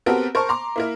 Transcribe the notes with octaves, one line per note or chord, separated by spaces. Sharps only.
B3 C4 F#4 G4 A4 A#4
A#4 C5 A5 C#6
A#5 C6 D6
A#3 E4 A#4